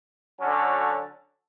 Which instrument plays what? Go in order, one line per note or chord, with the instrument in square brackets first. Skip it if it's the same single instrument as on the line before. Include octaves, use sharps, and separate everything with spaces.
[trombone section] D3 F#3 C#4 F#4 A4